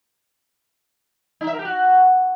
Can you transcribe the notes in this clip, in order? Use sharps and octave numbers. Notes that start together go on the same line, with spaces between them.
D#4
E5
A#4
G4
F#4